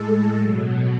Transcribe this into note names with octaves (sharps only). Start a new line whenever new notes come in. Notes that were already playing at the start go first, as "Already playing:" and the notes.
Already playing: A2 G#3 A4
B2 F#3